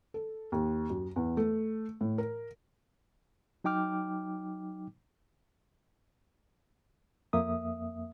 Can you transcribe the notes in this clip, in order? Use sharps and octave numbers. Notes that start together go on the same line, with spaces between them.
A4
D#2
F#2
E2
A3
A2
A#4
F#3 D#4 G5 D6 F6
F2 A#3 E5 D#6